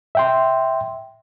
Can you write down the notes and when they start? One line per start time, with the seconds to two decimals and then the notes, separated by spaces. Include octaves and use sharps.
0.15 E5 G5 C6